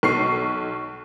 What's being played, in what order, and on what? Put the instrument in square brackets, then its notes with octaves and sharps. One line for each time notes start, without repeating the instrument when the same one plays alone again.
[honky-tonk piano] B1 C#6 C7